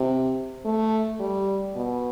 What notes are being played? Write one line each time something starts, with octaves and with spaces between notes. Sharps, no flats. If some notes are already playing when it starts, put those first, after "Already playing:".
Already playing: C3
A3
G3
B2